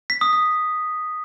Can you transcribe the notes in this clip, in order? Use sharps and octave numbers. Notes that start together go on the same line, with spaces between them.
B6
D#6
D#6